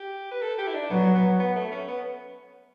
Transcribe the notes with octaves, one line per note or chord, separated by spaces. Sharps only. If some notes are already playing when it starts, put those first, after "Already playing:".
Already playing: G4
B4
A4
G4
E4
D4
F#3 B3
B3
B3
A3
C#4
B3